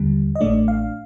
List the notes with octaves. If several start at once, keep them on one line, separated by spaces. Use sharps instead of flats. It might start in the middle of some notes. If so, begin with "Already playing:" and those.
Already playing: D#2 D3 G3
D#5
A1 A2 A3 D4 D5
F5